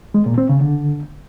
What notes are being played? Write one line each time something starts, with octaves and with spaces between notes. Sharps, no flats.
G#3
A#2
C4
C#3
D3